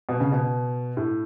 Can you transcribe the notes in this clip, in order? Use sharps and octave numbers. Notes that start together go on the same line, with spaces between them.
B2
C#3
B2
A2